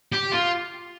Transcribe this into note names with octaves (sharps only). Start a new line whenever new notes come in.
G4
F4